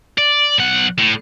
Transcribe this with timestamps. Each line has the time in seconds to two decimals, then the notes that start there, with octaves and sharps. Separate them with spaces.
0.18 D5
0.58 B1 F#5
0.98 A2